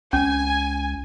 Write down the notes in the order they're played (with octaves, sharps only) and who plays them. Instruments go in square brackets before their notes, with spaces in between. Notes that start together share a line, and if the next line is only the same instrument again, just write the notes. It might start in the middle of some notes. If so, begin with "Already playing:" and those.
[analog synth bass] C#2 [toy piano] C#4 [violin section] G#5